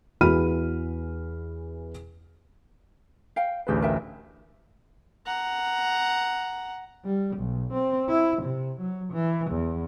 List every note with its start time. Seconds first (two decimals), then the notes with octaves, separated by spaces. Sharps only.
0.21 E2 E3 F#4 B5 F6 D#7
3.36 F5 G5
3.67 A1 D2 G4 G#4 B4 D5
3.82 A#4 E5 G5
5.26 F#5 A#5
7.05 G3
7.37 B1
7.73 C4
8.09 E4
8.43 C3
8.81 F#3
9.13 E3
9.51 E2